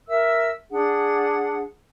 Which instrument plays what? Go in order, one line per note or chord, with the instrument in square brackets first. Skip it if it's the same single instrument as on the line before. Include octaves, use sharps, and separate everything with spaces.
[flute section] A#4 E5 E6
D4 G#4 F#5